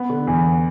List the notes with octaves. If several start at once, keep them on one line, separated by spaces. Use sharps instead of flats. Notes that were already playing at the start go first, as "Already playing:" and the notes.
Already playing: B3
D3
E2